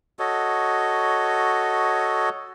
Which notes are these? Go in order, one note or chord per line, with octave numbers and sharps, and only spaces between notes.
F#4 A4 C#5 D#5